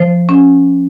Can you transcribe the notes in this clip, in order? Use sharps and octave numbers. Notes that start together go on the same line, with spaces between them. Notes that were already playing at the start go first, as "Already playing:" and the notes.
Already playing: F3 C5
C#4